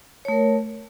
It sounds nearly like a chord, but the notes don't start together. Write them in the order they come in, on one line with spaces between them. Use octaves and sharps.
C#5 A3 A#4